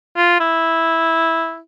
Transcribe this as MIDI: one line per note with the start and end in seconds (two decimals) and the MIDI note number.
0.16 0.38 65
0.40 1.58 64